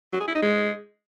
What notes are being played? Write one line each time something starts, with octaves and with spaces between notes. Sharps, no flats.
F#3
G#4
E4
D#4
G#3